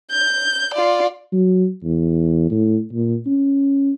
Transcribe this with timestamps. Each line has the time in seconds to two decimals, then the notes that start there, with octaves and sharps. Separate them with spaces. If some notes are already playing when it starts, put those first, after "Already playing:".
0.11 G6
0.74 F4 D5
1.33 F#3
1.84 E2
2.51 A2
2.93 A#2
3.27 C#4